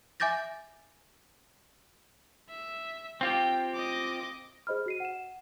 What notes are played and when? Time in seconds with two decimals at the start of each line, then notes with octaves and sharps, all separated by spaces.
0.20 E5 G#5 D6 G6 A6 A#6
2.50 E5
3.21 C4 F4 G4 G5
3.74 D#5 D6
4.67 G#4 C5 D#5 B5 F6
4.86 F#4 C7 D#7
5.00 F#5 E7